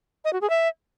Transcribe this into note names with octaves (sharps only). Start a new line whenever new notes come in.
D#5
F#4
G#4
E5